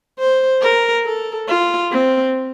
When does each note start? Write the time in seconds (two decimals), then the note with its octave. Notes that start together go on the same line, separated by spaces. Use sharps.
0.19 C5
0.62 A#4
1.06 A4
1.49 F4
1.92 C4